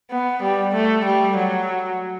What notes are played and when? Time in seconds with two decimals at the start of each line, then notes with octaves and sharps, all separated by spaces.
0.11 B3
0.42 G3
0.74 A3
1.05 G3
1.36 F#3